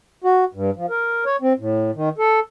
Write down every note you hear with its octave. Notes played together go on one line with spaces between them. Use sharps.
F#4
G2
F3
A#4
C#5
C4
A2
D#3
A4